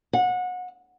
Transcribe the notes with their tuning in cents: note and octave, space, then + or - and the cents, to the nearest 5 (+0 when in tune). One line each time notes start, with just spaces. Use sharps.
F#5 -25